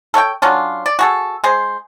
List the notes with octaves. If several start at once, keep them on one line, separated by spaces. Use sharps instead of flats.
A4 C#5 F#5 G5
F#3 C#4 D4 F4
D5
F#4 G#4 A4
G#3 G#4 C5